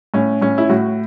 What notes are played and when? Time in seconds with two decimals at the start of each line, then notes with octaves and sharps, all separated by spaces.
0.14 A2 C#4
0.42 A2 C#4
0.58 E4
0.69 A2 F#4